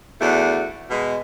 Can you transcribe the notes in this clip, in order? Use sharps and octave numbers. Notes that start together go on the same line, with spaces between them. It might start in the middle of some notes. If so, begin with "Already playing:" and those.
E2 A3 D4 F#4
B2 G#3